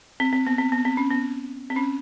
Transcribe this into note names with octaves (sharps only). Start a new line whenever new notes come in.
C4
C4
B3
C4
B3
C4
C#4
B3
C4
C#4